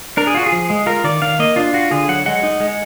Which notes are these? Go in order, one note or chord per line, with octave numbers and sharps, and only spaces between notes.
D4 A#4
G#4
F4 F#4
G#4
F3
G#3
F4 A#4
D#3 D5
D#3 F5
A#3 D#5
D4 F4
F4 F#4
D3 G#4
F#3 F#5
G#3 F#5
D#4
G#3